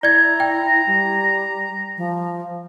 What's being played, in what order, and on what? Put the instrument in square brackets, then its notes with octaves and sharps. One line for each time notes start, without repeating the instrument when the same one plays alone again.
[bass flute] E4 [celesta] D5 G#6 [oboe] A#5
[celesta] G5
[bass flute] G3
F3